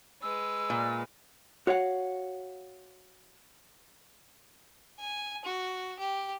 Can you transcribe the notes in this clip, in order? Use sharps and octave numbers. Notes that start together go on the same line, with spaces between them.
G#3 B4 E6
A#2
F#4 C#5 F5 F#5
G#5
F#4
G4